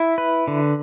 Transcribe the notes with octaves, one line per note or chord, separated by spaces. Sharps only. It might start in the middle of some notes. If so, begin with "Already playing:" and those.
Already playing: E4 E5
B4
D3